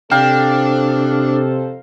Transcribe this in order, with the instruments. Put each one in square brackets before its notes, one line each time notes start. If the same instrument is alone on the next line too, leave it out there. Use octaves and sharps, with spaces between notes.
[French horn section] F2 A4 C5 [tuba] C3 [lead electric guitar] D4 [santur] F5 G5 A#5